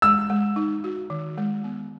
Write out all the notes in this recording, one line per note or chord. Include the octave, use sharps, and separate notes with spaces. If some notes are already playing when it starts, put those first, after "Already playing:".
G#3 E6
G#3
D#4
F#4
D#3
G#3
B3